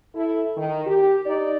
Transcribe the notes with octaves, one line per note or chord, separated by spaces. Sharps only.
E4 A4
D#3
G4
D#4 D5